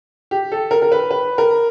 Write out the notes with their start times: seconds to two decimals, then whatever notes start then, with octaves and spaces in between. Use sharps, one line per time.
0.31 G4
0.52 A4
0.71 A#4
0.82 A#4
0.92 B4
1.11 B4
1.38 A#4